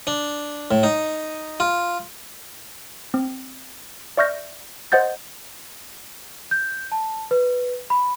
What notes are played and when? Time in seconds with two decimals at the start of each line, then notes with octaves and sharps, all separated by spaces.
0.07 D4
0.71 A2
0.83 D#4
1.60 F4
3.14 C4
4.17 D5 E5 C#6 F6 G6 A#6
4.92 C5 D#5 F#5 G6 A6
6.51 G6
6.92 A5
7.31 B4
7.90 B5